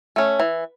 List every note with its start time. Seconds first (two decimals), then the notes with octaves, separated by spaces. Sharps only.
0.16 A3 C#4
0.40 E3